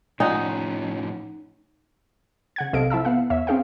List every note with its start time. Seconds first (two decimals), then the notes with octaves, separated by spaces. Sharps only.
0.20 A2 F3 C#4 D#4 F#5 G#5
2.56 C#3 F#5 G#6
2.73 B1 C3 A4 D#5 F5 D7
2.90 F3 E4 E5 A5 E6
3.05 B3 F5 F#5
3.30 E2 C#5 E5
3.47 C4 C#4 G#4 F5 G5